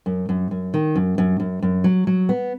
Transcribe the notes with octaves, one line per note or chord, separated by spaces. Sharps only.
F#2
F#2
F#2
D#3
F#2
F#2
F#2
F#2
F#3
F#3
B3